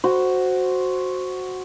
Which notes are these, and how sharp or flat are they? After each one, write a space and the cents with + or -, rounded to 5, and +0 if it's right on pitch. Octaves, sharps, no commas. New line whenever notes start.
F#4 +0 C5 +0